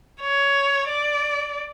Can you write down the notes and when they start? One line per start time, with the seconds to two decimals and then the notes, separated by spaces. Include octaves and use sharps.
0.21 C#5
0.88 D5